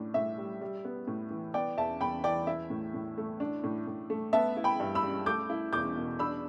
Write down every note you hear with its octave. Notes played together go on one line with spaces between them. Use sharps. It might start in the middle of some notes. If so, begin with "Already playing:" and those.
Already playing: A2 D4
A2 E5
G3
G3
B3
A2
E3
B3 D5 G5
E2 E5 A5
E2 G5 B5
E3 D5 G5
E4 E5
A2
A2
A3
D4
A2
A2
A3
B3 E5 A5
E4
G5 B5
G2
B5 E6
G3
A3 D6 G6
E4
E2 D6 G6
B2
D4 B5 E6